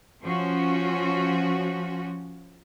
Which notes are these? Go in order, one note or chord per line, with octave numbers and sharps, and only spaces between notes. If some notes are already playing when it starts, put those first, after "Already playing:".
F3 C#4 F#4